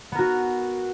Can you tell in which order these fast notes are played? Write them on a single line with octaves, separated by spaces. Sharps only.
B3 A#4 F#4